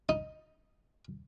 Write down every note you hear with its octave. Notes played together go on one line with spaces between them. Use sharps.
D#4